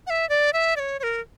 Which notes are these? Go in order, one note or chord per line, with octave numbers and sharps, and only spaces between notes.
F#5
E5
D5
E5
D5
C#5
C#5
A#4